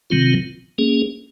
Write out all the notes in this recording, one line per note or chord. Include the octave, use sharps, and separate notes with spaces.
C3 D#3 F#3 C4 F4
A#3 C#4 G#4